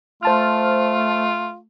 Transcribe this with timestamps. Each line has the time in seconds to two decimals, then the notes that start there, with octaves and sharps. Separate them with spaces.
0.23 A3 F4 C5 A5 F6